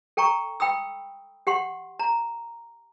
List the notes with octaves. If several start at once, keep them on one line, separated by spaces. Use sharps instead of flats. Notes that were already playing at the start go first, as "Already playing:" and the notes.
A4 G5 A#5 C#6
G5 B5 D#6 E6
G4 F#5 C6
A#5